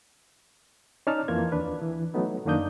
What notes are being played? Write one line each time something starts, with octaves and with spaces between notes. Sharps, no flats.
C#4 D#4 D5 A5 F6
F2 E3 A#3 F4 G#6
D#2 D4 B4
E3
F#3 A3 B3 D#4
F#2 D#3 A#3 D4 D#6 G6